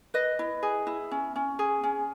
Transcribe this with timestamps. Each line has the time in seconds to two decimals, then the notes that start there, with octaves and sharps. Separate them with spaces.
0.14 B4 D#5
0.39 E4
0.63 G#4
0.87 E4
1.11 C#4
1.36 C#4
1.59 G#4
1.84 C#4